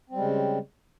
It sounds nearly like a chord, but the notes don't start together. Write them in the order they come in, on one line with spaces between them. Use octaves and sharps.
C4 G3 G#3 C#3